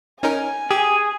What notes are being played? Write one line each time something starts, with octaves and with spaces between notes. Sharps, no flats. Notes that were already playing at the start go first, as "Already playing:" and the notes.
C#4 D#4 A#4 G#5
G4 G#4